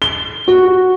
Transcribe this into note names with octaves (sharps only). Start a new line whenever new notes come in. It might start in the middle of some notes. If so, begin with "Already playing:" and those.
G7
F#4